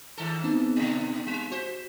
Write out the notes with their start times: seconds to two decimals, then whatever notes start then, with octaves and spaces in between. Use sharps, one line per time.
0.17 G#2 D#3 A4
0.44 B3 C4 D#4
0.76 B2 D3
1.26 G3
1.51 F#4 C5 B6